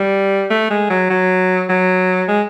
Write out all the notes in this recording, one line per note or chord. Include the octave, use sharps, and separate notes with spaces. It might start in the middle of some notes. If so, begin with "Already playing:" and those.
Already playing: G3
A3
G#3
F#3
F#3
F#3
G#3